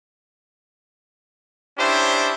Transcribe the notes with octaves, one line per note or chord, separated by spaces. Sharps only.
C#4 D4 E4 G4 C5